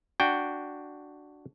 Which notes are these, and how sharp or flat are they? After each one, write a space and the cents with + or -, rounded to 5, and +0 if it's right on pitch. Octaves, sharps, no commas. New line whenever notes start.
D4 +0 F#4 +0 G5 +0